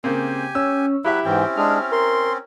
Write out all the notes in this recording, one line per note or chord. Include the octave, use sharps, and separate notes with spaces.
C#3 A#3 C4 G4 G#5
C#4 E6
F#3 E4 G4 B4 E5 B5
G#2 E3 C4 C#4 G5
G#3 D4 G#4 F6
A#4 C6